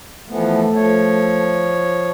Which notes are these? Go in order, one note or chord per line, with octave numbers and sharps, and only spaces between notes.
E3 F3 A3 B3
F3 C#5